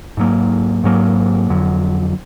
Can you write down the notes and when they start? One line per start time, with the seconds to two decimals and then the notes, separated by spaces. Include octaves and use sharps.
0.17 G#2 F#3 A#3
0.84 G#2 F#3 A#3
1.49 F2 D3 F#3